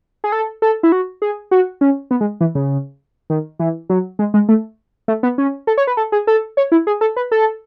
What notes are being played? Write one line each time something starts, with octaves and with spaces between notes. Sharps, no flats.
G#4
A4
A4
E4
F#4
G#4
F#4
C#4
B3
G#3
E3
C#3
D#3
E3
F#3
G#3
G#3
A3
A3
B3
C#4
A4
C#5
B4
A4
G#4
A4
C#5
E4
G#4
A4
B4
A4